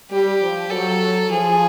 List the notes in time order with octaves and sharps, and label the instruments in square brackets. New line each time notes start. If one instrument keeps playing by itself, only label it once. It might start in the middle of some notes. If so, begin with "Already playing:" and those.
[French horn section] G3 [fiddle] G4
[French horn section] F3
[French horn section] F#3 [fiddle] A4
[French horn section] F3 [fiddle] G#4